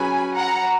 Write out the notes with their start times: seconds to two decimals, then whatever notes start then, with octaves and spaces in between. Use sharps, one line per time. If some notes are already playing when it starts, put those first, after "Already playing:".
Already playing: F#3 C#4 G#4 B4 G#5 B5
0.35 F#5 A#5